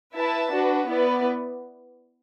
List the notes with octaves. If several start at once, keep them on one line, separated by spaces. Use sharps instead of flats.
E4 B4 E5 A5
D4 F#4 B4
B3 E4 B4 D5